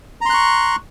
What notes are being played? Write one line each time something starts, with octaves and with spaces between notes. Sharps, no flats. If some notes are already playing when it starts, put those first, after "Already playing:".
A#5 C6 C#6 F#6